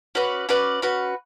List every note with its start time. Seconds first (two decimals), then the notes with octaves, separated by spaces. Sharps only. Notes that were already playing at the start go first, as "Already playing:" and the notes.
0.15 C#4 F#4 B4 D5
0.49 C#4 F#4 B4 D5
0.82 C#4 F#4 B4